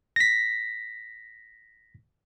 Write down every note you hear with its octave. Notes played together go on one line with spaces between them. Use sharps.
A#6 B6